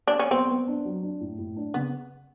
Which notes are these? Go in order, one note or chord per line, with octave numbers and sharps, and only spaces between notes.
D4
C#4
B3 C4
B3
D4
F#3
D4
A2
A2
D4
C#3 B3